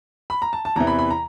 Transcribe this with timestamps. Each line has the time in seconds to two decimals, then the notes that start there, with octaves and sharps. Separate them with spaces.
0.30 B5
0.42 A#5
0.53 A5
0.65 A5
0.76 E2 C3 E3 A#5
0.87 B5
0.99 B5
1.11 A#5